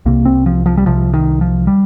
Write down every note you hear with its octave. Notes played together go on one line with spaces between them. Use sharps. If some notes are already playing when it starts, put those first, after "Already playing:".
C2 C3 A#3
C4
F3
F3
G3
C2 C3 F3
D#3
F3
G3